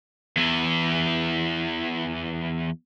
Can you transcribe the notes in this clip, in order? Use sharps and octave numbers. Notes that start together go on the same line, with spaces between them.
E2 E3